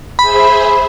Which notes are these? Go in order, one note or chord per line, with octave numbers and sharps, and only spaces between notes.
G#4 C5 E5 B5